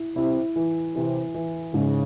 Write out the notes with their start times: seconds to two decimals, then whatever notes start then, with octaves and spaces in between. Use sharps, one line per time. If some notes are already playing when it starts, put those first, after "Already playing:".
Already playing: E4
0.15 C3 E4
0.56 E3
0.96 C3 E3
1.35 E3
1.74 G#2 C#3